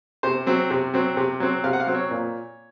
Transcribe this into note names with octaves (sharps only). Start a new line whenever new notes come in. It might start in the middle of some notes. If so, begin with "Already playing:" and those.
C3 C5
F#3 C4
C3
F#3 C4
C3
F#3 C4
C3 F5
F#5
F5
F#3 C4
C#5
A#2